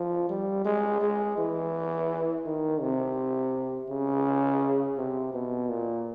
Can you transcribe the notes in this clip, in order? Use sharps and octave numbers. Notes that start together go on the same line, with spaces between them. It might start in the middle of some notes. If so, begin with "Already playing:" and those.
Already playing: F3
G3
G#3
G#3
E3
D#3
C3
C#3
C3
B2
A#2